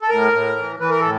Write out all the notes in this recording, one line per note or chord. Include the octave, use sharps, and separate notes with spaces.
A4
A2 A#4
A2
E3
E3 B4
A#4
A2 A4